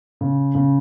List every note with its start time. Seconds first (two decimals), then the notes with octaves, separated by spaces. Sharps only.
0.21 C#3
0.55 C#3